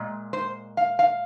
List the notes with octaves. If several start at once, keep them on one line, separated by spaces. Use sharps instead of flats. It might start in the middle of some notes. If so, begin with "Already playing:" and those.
Already playing: A#2 G#3
C5
F5
F5